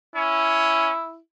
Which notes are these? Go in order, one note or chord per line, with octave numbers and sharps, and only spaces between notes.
C#4 E4